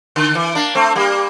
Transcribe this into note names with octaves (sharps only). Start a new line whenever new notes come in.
D3
E3
A#3 D4
A3 C4
G3 A#3